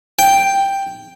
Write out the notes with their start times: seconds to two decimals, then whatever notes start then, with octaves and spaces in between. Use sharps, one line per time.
0.19 G5